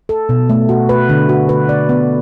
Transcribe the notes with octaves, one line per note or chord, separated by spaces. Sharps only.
A4
B2
A3
F#4
B4
D3
F#4
B4
D5
B3